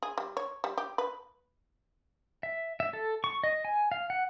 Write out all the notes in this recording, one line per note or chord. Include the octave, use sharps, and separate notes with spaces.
G#4
G3
C#5
G3
G4
B4
E5
E5
A4
C#6
D#5
G#5
F5
F#5